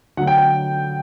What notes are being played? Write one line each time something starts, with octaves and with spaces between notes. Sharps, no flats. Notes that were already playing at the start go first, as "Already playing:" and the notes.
D3 F#3 A3 F#5
G5
G5